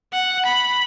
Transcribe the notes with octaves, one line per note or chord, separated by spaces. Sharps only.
F#5
B5